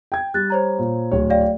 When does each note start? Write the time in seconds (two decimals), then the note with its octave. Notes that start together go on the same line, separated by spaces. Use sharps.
0.12 G5 G#6
0.34 G3 F#6 A6
0.50 C5 C#5 A#5
0.79 A#2
1.12 D1 C#5
1.30 D5 F5 G5